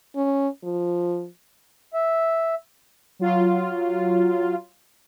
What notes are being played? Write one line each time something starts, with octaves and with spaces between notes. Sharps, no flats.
C#4
F3
E5
F#3 F4